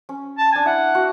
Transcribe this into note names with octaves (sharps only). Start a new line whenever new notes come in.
C#4
A5
D4 G#5
E4 F#5
F#4